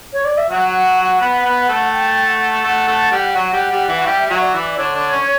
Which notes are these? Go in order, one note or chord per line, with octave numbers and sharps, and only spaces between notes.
C#5
D5
E5
F#3 F#4 F#5
B3 B4
B3 B4
A3 A4
G5
F#5
A3 A4 F#5
A3 A4
G3 G4
F#3 F#4
G3 G4
G3 G4
E3 E4
F#4
G3 G4 E5
G4
F#3 F#4 E5
D5
E3 E4
D3 D4 C#5
D3 D4
C#4